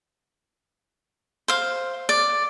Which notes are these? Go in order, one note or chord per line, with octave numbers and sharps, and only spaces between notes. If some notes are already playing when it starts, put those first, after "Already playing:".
C5 F5
D5